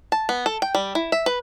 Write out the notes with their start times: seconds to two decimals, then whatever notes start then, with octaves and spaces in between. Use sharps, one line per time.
0.12 A5
0.29 B3
0.46 A4
0.62 G5
0.75 G3
0.95 E4
1.12 E5
1.26 B4